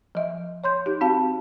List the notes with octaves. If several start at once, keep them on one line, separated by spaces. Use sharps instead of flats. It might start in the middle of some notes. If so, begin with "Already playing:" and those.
F3 D#5 E5
C#5 C6 G6
D#4 G4
C4 F#4 F5 A5